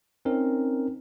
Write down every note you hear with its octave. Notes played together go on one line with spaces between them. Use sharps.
C4 C#4 D#4 A#4